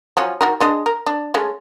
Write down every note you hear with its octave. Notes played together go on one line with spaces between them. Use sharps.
F3 F#3 C#4
D#3 F#4 A#4
G#3 D4 D#5
A#4
D4
G#3 A3 C#4